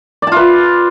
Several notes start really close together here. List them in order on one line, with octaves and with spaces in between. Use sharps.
D5 A5 F4 B4